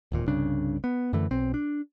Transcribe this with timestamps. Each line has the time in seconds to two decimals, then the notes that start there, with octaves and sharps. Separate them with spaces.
0.12 D1 D#2 A#2
0.28 C2 G2 C#3 D4
0.84 B3
1.13 F#2 D3 E3 A3
1.31 B1 C4
1.54 D4